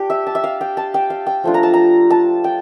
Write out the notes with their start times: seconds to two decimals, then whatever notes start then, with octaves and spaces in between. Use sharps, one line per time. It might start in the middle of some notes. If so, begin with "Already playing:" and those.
Already playing: D4 G4
0.10 E5
0.27 A5
0.35 E5
0.44 F5
0.61 G5
0.77 A5
0.94 G5
1.10 F5
1.27 G5
1.44 F3 A3 D4 F4
1.54 A#5
1.63 A5
1.74 A#5
2.10 A5
2.44 G5